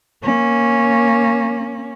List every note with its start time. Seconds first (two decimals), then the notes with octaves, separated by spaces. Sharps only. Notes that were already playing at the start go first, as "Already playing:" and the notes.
0.23 A#3 C#4